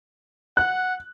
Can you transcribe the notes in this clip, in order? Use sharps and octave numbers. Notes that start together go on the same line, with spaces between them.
F#5 F#6